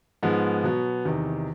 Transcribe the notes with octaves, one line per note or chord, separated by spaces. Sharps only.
G#2 F3 G#3 B3
B2 F#3 B3
E2 C3 D#3